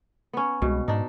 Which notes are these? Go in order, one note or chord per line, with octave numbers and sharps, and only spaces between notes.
B3 C#4
C2 B2 G#3
G#2 D4 D#4